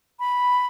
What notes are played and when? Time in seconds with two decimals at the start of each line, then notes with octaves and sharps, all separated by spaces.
0.20 B5